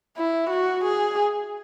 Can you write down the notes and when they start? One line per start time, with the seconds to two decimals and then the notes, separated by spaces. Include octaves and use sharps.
0.17 E4
0.50 F#4
0.84 G#4